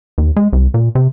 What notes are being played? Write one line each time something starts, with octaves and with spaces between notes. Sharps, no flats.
D#2
G#3
C2
A#2
C3